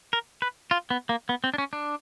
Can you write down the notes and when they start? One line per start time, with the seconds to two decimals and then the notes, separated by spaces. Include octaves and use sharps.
0.13 A#4
0.42 B4
0.71 F4
0.90 B3
1.09 A#3
1.29 B3
1.44 C4
1.54 D4
1.58 C#4
1.73 D4